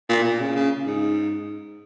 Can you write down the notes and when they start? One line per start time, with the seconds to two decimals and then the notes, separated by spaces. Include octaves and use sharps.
0.09 A#2
0.24 A#2
0.40 C#3
0.56 C#3
0.86 G#2